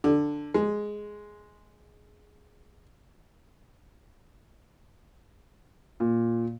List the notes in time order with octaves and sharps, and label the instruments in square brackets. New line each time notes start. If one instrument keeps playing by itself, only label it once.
[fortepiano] D3
G#3
[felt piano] A#2